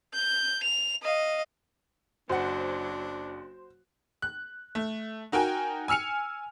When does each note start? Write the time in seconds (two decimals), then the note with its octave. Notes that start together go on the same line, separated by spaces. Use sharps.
0.14 G6
0.63 F7
1.03 D#5 F5
2.29 F#1 F#3 D4 F#4 C5 F#5
4.22 F#6
4.75 A3
5.32 D#4 F#4 A#4 G5 G#5
5.88 G#5 E6 F6 C#7 F7